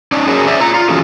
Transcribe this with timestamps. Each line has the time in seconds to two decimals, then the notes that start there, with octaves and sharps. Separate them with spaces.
0.12 C#4 D#4 D5
0.27 C#4 F#4 G#4 A#4 C#5
0.47 C5 D5 E5
0.60 F4 A#5
0.74 F4
0.89 E3 A3 C#4 F#4 G#4